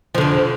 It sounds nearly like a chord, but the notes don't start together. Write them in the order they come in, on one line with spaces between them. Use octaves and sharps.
F3 D3 F2